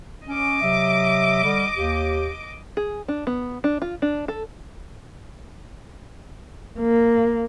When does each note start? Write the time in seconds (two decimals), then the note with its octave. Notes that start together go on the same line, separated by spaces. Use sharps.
0.28 C#4 D#5 D6
0.62 C3 F#3 E5
1.44 D3 G3
1.77 D#2 G4
2.77 G#4
3.08 D4
3.27 B3
3.64 D4
3.82 F4
4.02 D4
4.28 A4
6.79 A#3